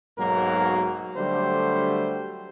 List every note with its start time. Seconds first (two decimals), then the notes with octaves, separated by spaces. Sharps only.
0.18 B1 G#2 F#3 A#3 F#4 A#4
1.17 D3 F#3 G3 A3 G4 C5